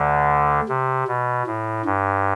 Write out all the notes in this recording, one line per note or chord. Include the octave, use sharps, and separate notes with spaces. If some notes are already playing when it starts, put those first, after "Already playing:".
Already playing: D2 D3
C3
B2
A2
G2